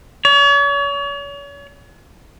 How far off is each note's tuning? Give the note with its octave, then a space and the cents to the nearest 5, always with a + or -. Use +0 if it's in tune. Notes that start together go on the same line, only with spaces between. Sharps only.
C#5 +40